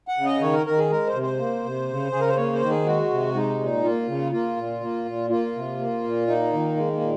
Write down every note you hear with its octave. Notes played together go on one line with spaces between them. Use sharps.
F#5
C#3
D#5
D#3 C#5
A#4
D#3 A#4
G#4
G#3 A#4
C5
C3
C5
A#3
C3
C#3
C#3 G#4
A#4
C5
A#3 C#5
C5
D#3
G#4
G#3 F#4
C3
G#3 D#4
A#2
A#3 F4
C#3
A#3 F4
A#2
A#3
A#2
A#3 F4
C3
A#3
A#2
A#3 D#4
D#3
G#3
A#3
A#2